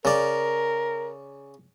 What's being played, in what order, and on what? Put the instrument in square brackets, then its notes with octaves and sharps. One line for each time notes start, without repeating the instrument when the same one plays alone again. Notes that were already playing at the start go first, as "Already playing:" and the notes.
[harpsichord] C#3 D5 [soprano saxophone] A#4